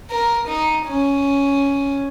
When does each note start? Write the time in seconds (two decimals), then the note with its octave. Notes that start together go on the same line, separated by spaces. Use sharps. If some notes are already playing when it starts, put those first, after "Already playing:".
0.10 A#4
0.48 D#4
0.86 C#4